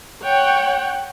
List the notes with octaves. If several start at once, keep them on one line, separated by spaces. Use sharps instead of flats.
C#5 F#5 G5